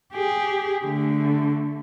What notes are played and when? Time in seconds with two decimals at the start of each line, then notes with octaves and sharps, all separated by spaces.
0.13 G4 G#4
0.84 D3 A3